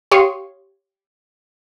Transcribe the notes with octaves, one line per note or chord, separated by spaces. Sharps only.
G4 C#5 F5 C6 C#6 D#6